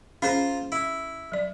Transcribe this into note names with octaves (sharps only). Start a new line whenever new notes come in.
C#4 F4 G#4 C5 A#5
E4
F#3 D5